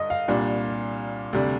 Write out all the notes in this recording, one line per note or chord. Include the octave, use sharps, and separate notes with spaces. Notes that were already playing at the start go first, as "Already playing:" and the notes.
Already playing: G2 D3 D#5
F5
C2 A#2 G3 D4
D2 C3 G3 D4